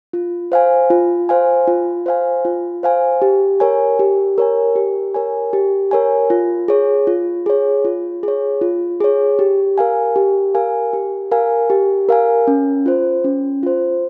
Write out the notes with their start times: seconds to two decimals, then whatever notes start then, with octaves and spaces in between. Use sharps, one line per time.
0.13 F4
0.52 C5 F5 G#5
0.90 F4
1.29 C5 F5 G#5
1.68 F4
2.06 C5 F5 G#5
2.45 F4
2.83 C5 F5 G#5
3.22 G4
3.60 A#4 C#5 G#5
3.99 G4
4.38 A#4 C#5 G#5
4.76 G4
5.14 A#4 C#5 G#5
5.53 G4
5.91 A#4 C#5 G#5
6.30 F4
6.68 G#4 C#5
7.07 F4
7.46 G#4 C#5
7.85 F4
8.23 G#4 C#5
8.61 F4
9.01 G#4 C#5
9.39 G4
9.78 A#4 F5 G#5
10.16 G4
10.55 A#4 F5 G#5
10.93 G4
11.31 A#4 F5 G#5
11.70 G4
12.09 A#4 F5 G#5
12.47 C#4
12.86 F4 C5
13.24 C#4
13.63 F4 C5